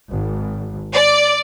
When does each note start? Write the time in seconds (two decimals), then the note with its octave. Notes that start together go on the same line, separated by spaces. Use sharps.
0.11 G#1
0.95 D5